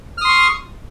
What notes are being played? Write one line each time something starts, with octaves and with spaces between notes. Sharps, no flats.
C6 C#6 D#6 F6